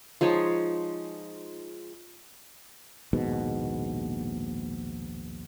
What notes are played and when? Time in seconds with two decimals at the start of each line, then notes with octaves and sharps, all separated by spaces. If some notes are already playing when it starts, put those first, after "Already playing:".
0.21 F3 G#3 D#4 C#5
3.13 A#1 D#2 G#2 B2